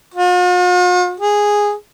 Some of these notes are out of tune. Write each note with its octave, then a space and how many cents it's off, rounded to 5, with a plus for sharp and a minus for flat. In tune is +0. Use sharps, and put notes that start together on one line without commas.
F4 +45
G#4 -10